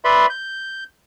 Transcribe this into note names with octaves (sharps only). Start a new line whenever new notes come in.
B4 D5 E5 B5 C6
G6